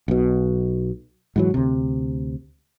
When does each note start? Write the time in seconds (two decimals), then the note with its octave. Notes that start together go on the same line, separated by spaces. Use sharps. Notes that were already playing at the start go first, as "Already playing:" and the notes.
0.08 B1 B2
1.36 G#2 E3 F#3
1.54 D2 C3